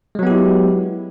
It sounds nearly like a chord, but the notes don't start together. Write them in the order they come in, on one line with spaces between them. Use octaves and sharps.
G#3 F#3 B3 G4 E4